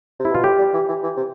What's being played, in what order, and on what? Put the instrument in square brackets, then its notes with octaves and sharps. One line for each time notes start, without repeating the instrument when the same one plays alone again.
[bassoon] C3
[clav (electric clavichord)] E4
[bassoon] B2 [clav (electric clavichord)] F4
[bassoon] A2 [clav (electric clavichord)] G4
[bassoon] G3
E3
E3
E3
C3